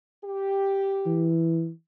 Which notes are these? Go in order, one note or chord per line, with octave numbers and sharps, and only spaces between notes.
G4
E3